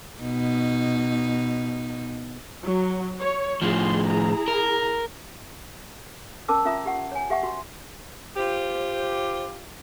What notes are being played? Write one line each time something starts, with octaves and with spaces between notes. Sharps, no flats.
B2 D#4
F#3
C#5
A2 F3 G#4 C6
E4 G#4 A#5
A#4
C#4 A#4 A5 D6 E6
C#4 F4 E5 A#5 D#6
G4 F#5
C#5 G#5
G4 E5 F#5 C#6
F#4 C6
F4 G4 C5